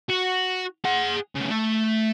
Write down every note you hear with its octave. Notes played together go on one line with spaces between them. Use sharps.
F#4
G#4 F#5
A2 C#3
A3